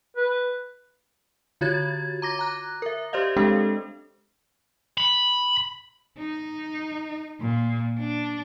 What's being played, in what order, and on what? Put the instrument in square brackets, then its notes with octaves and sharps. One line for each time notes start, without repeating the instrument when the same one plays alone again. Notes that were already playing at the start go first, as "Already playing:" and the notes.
[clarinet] B4
[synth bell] D3 F4 F#4 C#5 G#6 A6
A#5 D6 A#6
A#5 F#6
A#4 E5
G4 C5 D5 D#5 F5
G#3 C4 D4 G4 A4
[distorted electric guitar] B5
[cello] D#4
A#2
D4